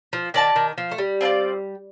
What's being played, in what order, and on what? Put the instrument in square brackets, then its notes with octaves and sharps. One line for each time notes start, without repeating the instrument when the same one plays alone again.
[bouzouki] F3
[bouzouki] D#3 [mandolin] G4 D5 A5
[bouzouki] D#3
F3
A3
G3
[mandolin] C4 F4 A#4 D5